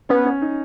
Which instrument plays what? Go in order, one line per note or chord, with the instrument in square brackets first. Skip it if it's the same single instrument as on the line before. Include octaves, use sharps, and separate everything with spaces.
[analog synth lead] B3 [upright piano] C#4
[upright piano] C#4
D#4